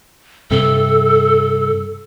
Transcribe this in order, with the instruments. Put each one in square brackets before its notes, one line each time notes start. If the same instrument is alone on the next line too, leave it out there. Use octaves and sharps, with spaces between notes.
[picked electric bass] G2 C3 [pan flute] A4